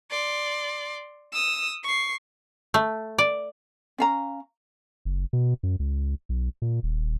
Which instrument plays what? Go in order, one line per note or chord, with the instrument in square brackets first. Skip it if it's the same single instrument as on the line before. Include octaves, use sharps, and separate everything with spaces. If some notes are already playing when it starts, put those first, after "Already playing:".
[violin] D5 C6
D#6 E6
C#6 C7
[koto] A3
D5
[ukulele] C#4 F5 A#5
[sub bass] F#1
B2
F#2
C#2
B1
A#2
D#1